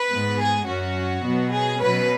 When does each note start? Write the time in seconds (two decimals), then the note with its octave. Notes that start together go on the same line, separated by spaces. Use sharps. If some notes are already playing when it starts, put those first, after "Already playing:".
Already playing: B4
0.10 G#2 G#3 B3
0.38 G#4
0.67 F#2 F#3 C#4 F#4
1.23 B2 F#3 B3
1.52 G#4
1.79 B2 F#3 C#4 B4